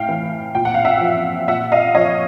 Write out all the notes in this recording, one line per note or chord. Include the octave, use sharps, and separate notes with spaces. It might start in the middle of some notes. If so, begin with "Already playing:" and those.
Already playing: A2 F5 G5
E3
A#2 G5
F#5
F5
E5 F#5
F3
A#2 E5 F#5
D#5 F5
F3 C#5 D#5